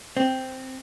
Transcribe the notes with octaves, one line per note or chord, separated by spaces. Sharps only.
C4